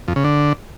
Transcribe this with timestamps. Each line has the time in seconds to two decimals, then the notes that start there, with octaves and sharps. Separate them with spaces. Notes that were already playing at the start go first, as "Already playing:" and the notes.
0.08 F2
0.16 C#3
0.24 D3